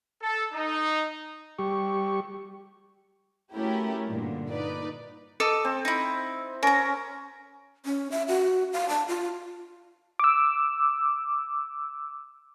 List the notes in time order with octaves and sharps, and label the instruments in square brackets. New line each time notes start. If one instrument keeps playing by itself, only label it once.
[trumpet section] A4
D#4
[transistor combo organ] G3 G4 C#6
[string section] A3 C#4 E4 F#4 G4 A#4
G2 A#2 D3
D#4 B4 D5
[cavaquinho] A4 D#5 D6
[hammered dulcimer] C4
[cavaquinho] D#4 E4
[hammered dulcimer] C#4 [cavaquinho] A#4 A#5
[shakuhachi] C#4
E5
F#4
F5
A5
F4
[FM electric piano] D6 E6